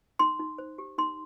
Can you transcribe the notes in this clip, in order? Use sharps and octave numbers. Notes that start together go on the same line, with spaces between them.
D#4 C6
D#4
C5
G4
D#4 C6